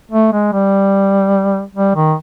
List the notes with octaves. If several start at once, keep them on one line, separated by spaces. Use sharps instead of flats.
A3
G#3
G3
G3
D#3